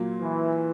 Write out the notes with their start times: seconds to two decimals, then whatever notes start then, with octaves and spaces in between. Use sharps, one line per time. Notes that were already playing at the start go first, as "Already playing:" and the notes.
Already playing: A#2 F#3 A#3
0.21 E3